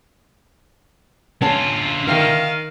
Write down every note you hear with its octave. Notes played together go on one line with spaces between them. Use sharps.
D3 C#4 F4 C#5 A5
D#3 E5 F5